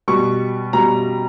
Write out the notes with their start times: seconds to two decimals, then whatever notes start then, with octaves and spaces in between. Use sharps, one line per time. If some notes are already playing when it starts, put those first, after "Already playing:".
0.08 B2 G3 C#6
0.73 B2 G3 A#5